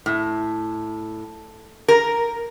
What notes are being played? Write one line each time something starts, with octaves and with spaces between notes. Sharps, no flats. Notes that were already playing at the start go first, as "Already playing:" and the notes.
A2
A#4